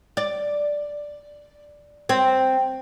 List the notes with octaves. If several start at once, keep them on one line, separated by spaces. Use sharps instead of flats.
D5
C4